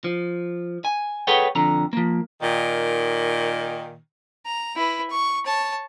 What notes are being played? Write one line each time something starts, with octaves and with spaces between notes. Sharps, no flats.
F3
G#5
G#4 A4 B4 C#5 F#5 G5
F2 D3 A#5
F3 A#3
A#2 D#3
A#5
E4 B4
C#6
C#5 A5